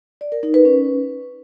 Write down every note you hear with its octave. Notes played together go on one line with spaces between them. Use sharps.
D5
A#4
D#4
B4
C#4